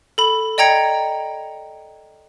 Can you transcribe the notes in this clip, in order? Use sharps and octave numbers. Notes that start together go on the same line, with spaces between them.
A4 B5
D5 D#5 G5 A#5 G#6 C#7